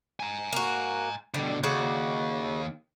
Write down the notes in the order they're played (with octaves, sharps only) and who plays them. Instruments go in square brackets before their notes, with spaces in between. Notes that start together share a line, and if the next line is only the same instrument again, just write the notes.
[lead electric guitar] G#5 A#5
[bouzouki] A#3 F#4
[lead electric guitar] B2 D3 [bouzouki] G3
[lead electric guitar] D#2 [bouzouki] C#3 F#4 D5